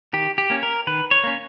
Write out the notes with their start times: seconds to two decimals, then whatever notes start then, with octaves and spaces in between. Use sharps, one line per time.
0.13 D#3 G4
0.38 G4
0.50 A#3 C#4
0.63 A#4
0.87 D#3 B4
1.11 C#5
1.24 A#3 C#4